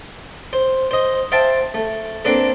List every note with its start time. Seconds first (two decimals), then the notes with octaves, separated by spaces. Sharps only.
0.53 C5
0.91 C5 D#5
1.32 C5 E5 F5 G5 A5
1.74 A3
2.25 A#3 C4 D4 A4 B4